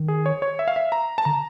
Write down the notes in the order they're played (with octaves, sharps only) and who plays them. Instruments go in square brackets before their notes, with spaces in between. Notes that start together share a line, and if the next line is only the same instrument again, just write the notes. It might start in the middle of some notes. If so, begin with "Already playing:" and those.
Already playing: [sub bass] D#3
[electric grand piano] G#4
C#5
C#5
E5
F5
E5
A#5
A5
[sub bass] D3 [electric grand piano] A#5